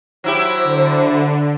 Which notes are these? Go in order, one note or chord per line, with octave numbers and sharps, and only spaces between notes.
F#3 E4 G4 C5
D3